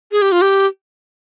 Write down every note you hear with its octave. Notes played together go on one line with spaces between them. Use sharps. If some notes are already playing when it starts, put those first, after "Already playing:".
G#4
G4
F4
G4